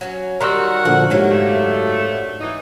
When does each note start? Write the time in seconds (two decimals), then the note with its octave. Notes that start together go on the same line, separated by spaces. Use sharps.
0.01 F#3 C#4
0.41 D#3 G3 F#4 A#4 A#5 C6 E6
0.85 A#2 D3 F3 F#5
1.10 G#2 C3 F#3 A#3
1.31 F#2 D3 A3
2.41 E3 D#4